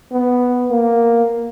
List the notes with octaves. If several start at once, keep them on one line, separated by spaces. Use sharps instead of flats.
B3
A#3